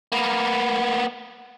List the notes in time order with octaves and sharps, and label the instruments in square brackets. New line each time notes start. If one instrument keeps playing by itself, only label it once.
[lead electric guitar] A#3 B3